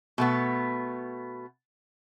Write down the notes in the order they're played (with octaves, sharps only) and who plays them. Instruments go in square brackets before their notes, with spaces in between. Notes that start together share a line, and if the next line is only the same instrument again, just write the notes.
[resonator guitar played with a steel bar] B2 A3 B3